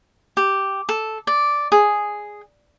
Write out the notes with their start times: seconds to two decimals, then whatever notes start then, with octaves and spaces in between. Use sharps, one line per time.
0.37 G4
0.89 A4
1.27 D5
1.72 G#4